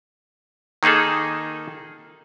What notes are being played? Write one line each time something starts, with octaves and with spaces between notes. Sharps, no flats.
D#3 A#3 D#4 G#4 A4